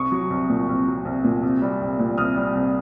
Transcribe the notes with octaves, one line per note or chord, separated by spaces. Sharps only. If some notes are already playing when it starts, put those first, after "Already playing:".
Already playing: C2 C#6 D#6
F#3
C2
A#2
C2
F#3
C2
A#2
C2
G3
C2
A#2
C2 D#6 F6
G3
C2